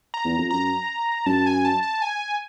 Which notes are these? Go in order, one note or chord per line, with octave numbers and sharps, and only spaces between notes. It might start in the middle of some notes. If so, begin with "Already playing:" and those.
A#5
E2
F2
F#2 A#5
F#2 A5
G#5
A5
A5
G#5